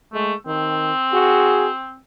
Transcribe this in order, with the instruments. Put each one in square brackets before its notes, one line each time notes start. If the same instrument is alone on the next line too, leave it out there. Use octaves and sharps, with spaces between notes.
[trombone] G#3 [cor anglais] A3
[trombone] D#3 [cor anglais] C4
[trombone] F#4 [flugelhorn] G#4